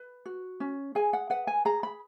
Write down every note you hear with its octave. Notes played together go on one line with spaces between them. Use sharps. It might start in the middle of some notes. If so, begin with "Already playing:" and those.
Already playing: B4
F#4
C#4
G#4 G#5
F#5
B4 F#5
G#5
G#4 A#5
B5